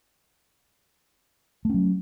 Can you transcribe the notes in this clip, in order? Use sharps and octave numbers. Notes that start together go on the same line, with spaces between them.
F#3 A3 C#4